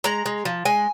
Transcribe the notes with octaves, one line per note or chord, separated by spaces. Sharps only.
G#3 A#5
G#3
F3
G#3 G#5